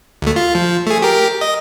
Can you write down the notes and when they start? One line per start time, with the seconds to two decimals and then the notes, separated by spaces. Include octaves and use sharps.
0.22 D2 A3
0.36 F4
0.55 F3
0.87 A3 G#4
1.02 G4 A#4
1.41 D#5